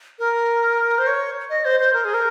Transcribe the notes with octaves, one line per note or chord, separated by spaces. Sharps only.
A#4
C5
C#5
D#5
C5
C5
A#4
G#4
A#4